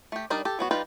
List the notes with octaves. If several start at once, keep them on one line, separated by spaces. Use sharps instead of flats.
A3 G4
G3 D4 D#4 A#4 D5
G4 A4
F#3 B3 F#4
G3 D#4 F4 B4 G5